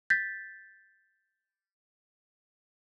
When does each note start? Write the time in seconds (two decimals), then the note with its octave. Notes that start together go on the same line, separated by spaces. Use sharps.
0.10 G6 A6 B6